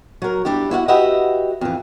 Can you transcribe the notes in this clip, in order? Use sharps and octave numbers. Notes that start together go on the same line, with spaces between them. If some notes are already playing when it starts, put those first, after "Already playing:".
F#3 A#4
G3 D4 E4 G4
E4 F#4 F5 F#5
F#4 G4 B4 D#5 E5 F#5
F2 E3